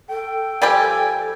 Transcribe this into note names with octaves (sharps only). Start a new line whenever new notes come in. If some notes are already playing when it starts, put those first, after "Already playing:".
A4 G5
F3 G3 G4 G#5